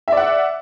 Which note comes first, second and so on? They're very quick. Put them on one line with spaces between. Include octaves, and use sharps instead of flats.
E5 D5 F#5